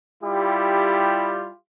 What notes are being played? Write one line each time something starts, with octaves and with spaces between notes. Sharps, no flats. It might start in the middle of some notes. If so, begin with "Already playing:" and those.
G3 E4 F4 G4